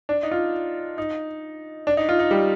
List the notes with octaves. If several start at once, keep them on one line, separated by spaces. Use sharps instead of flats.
D4
D#4
F4
D#4
D4
D#4
F4
D#4
G3